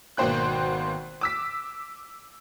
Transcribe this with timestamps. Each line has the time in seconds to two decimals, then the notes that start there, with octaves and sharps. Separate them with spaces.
0.17 G#1 B2 A#3 C5 G5 F#6
1.21 D6 E6 B6